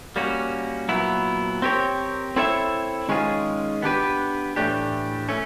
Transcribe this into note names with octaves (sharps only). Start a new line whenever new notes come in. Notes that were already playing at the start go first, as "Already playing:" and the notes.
G3 A#3 C#4 F#4
A#2 F#3 B3 E4
C4 E4 G4 A#4 C#5
C4 E4 A4 C#5 E5
D#3 G#3 C#4 F4 G#4
B3 D4 G4 B4
A2 E3 A3 D4 G4
A3 C#4